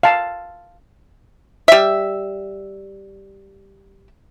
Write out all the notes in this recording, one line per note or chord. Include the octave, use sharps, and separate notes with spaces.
F5 A5
G3 E5